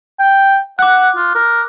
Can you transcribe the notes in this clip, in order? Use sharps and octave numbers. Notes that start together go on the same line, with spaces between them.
G5
F#5 D6 F#6
F4
A#4